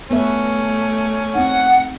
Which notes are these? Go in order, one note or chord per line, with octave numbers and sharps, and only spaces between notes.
A3 B3 C#4 B4 E5
C4 D#4 F#5